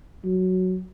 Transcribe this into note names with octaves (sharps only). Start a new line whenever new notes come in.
F#3